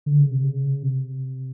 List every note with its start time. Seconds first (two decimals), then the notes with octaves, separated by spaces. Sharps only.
0.06 D3
0.19 C#3
0.31 C3
0.43 C#3
0.83 C3